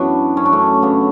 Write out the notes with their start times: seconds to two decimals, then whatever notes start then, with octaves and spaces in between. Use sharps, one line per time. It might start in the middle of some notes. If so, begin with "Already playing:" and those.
Already playing: F#2 E3 B3 D4 F#4
0.37 F#2 C#4
0.46 D4
0.53 A3 C#4
0.82 C#3 B3 D4